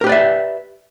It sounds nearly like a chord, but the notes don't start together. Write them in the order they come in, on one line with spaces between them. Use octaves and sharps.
A#4 G4 B4 D5 E5